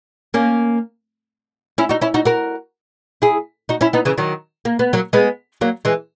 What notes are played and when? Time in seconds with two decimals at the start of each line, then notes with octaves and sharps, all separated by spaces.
0.34 A#3 C#4
1.78 C#4 E4
1.89 D#4 F#4
2.01 C#4 E4
2.14 D#4 F#4
2.25 F#4 A#4
3.22 E4 G#4
3.69 D#4 F#4
3.81 C#4 E4
3.93 B3 D#4
4.05 C#3 E3
4.18 D#3 F#3
4.65 A#3
4.79 B3
4.93 F#3 A#3
5.13 G#3 B3
5.61 F#3 A#3
5.85 E3 G#3